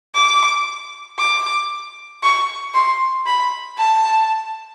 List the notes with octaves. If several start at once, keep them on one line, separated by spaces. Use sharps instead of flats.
D6
D6
C#6
C6
B5
A5